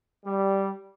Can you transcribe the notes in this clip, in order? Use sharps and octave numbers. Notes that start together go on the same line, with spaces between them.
G3